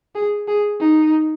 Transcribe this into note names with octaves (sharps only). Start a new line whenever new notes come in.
G#4
G#4
D#4